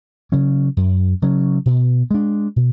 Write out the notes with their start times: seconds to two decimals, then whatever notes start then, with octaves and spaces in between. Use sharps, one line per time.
0.32 C#3 F#3 C#4
0.77 F#2
1.22 C#3 F#3 C#4
1.66 B2
2.11 G#3 D4
2.56 B2